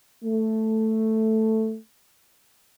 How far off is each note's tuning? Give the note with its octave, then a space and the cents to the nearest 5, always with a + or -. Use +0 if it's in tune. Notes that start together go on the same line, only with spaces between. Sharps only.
A3 +0